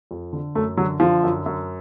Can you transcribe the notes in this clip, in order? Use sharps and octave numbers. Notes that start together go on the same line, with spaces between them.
F2
D3
F#2 A3
D3 F#3
D3 F3
F#2
F#2